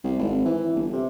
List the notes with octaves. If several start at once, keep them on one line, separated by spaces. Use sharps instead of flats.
C2
G#1
E3
G1
C3